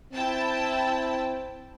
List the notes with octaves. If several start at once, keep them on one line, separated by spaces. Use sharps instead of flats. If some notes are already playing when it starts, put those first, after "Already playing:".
C4 E4 G5 A5